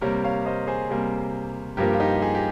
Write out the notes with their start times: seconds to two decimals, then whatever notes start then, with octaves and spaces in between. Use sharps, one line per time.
0.01 C3 G3 A#3 A#4 C#5
0.24 C#5 F5
0.46 C5 D#5
0.67 G#4 C5
0.90 C3 G3 A#3
1.77 G2 F3 A#3 G4 A#4
1.93 F4
2.00 D#4 G4
2.15 G4
2.22 F4 G#4
2.35 G4